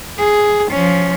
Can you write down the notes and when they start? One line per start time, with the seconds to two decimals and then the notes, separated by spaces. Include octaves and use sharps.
0.19 G#4
0.72 F3 C#4